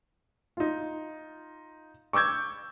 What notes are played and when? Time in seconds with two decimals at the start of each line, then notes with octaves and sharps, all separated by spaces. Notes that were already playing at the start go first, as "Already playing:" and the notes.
0.57 D#4 F4
2.13 C#6 D6 E6 G6 G#6